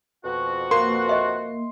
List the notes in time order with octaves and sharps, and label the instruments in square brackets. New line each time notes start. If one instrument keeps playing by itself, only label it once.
[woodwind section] F2 B2 F#4
[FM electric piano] A#3 [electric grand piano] C6
[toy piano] D#5 E5